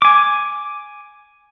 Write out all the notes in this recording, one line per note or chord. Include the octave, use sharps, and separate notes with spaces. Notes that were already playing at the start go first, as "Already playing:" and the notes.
G#5 D6